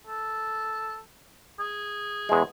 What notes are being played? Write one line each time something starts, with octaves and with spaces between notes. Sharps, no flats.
A4
G#4
E2 G#3